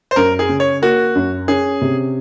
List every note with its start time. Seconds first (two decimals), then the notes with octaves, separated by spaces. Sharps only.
0.11 C5
0.16 F#2 A#4
0.39 G#4
0.49 C#3
0.60 C#5
0.82 A#3 F#4
1.15 F#2
1.48 C#4 G#4
1.81 C3